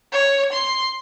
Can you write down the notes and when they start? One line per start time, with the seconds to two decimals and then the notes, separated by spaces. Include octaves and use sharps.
0.12 C#5
0.52 C6